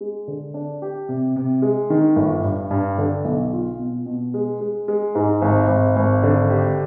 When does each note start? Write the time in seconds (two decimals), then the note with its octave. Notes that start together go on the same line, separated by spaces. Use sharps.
0.01 G#3
0.28 D3
0.54 D4
0.82 G4
1.09 C3
1.36 C3
1.62 G#3
1.90 D#3
2.16 G1
2.44 G2
2.71 G2
2.98 D3
3.25 B1
3.53 F4
3.79 B2
4.06 B2
4.34 G#3
4.61 G#3
4.88 G#3
5.15 G#2
5.42 G#1
5.68 G#1
5.96 G#1
6.23 D3
6.50 G4